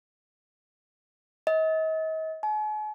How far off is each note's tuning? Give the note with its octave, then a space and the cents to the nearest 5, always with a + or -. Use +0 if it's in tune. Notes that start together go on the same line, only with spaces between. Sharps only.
D#5 +40
G#5 +45